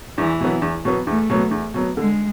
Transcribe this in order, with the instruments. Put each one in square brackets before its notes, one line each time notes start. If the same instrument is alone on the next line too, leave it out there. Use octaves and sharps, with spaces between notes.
[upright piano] E2 [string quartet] E3
[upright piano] B2 F#3 B3
E2
B2 F#3 B3
[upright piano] E2 [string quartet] A3
[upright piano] B2 F#3 B3
E2
B2 F#3 B3
[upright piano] D3 [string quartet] G#3